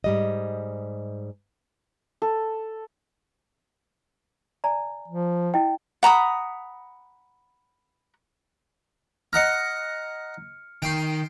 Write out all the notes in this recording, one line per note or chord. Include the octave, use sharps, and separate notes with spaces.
G#2 G3 D#5
A4
D5 G#5 A#5
F3
E4 D#5 G5
F#5 A#5 B5 D#6
D#5 F#5 A#5 F6 C#7
D#3 G5 C6